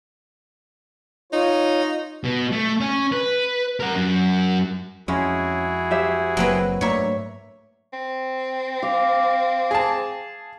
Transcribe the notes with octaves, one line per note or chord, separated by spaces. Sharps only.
D#4 F4 C#5
B2
A3
C#4
B4
A#4 F#5
F#2
F2 G#3 C#4 E4 F#4 G#4
G4 C5 E5
F#1 F#3 A#3 C4 B4
G#2 A3 A#3 D4 C#5 E5 A#5
C4
F5 D6
G#4 A5